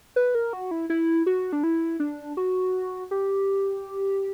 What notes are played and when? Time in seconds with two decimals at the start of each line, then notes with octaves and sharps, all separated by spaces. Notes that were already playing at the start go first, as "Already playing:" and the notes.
0.16 B4
0.35 A#4
0.53 F#4
0.71 E4
0.90 E4
1.26 F#4
1.53 D4
1.64 E4
2.00 D4
2.37 F#4
3.11 G4